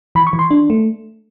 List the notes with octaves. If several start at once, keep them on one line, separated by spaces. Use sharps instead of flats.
E3 B5
C#6
E3
C6
D4
A3